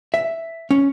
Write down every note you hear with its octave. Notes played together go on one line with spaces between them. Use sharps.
E5
C#4